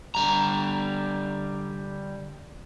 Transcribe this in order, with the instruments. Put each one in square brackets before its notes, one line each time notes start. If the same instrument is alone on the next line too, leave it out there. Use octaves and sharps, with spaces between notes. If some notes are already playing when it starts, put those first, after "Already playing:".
[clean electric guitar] D3 G3 A#5